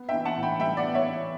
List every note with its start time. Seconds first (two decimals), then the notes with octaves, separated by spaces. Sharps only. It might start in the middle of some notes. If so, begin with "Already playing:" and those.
Already playing: B3
0.09 E5 G5
0.14 E3
0.25 F#5 A5
0.37 A2
0.43 G5 B5
0.60 G3 E5 G5
0.77 D5 F#5
0.84 B3
0.95 C#5 E5
1.06 E3